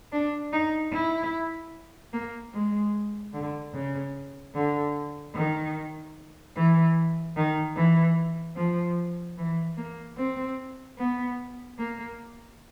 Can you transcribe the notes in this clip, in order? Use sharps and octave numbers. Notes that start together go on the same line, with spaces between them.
D4
D#4
E4
A#3
G#3
D3
C#3
D3
D#3
E3
D#3
E3
F3
E3
A#3
C4
B3
A#3